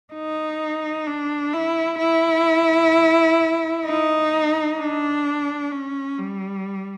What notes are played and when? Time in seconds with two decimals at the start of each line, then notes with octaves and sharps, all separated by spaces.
0.14 D#4
1.07 D4
1.54 E4
1.99 E4
3.86 D#4
4.79 D4
5.72 C#4
6.18 G3